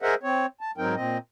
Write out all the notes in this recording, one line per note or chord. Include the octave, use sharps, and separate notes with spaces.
G#4 A#4 C5 D#5 E5 F#5
C4 C#5
A5
G#2 F#3 C4 D#4 A#4 G5
A#2 C4 D#5